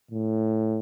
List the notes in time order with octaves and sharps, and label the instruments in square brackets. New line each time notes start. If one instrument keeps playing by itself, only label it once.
[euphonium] A2